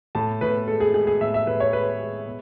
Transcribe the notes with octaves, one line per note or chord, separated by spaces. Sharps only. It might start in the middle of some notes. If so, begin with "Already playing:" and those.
A2 A5
A2 B4
G#3 A4
G#4
G#3 G#4
G#4
A2 E5
E5
A2 B4
C#5
G#3 B4
G#3
B2